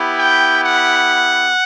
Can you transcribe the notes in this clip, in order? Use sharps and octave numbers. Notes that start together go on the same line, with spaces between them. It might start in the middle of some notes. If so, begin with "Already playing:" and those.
Already playing: B3 E4 G4
G5
F#5